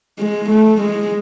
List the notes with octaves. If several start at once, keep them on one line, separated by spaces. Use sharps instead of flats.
G#3
A3
G#3